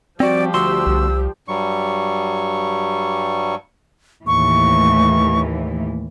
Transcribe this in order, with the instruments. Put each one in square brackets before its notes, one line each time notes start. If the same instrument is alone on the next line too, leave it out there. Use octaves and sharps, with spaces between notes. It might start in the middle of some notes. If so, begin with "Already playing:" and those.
[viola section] F3 G3 G4 [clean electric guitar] C4 F#4 [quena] D5
[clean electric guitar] D2 F#4 C6 [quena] E6
[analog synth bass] C2
[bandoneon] G2 F#3 G3 C#6
[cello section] D#2 A2 E3 [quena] C#6